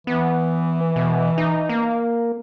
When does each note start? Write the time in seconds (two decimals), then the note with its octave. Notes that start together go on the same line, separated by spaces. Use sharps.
0.07 E3 B3
0.96 B2
1.38 D#4
1.69 A#3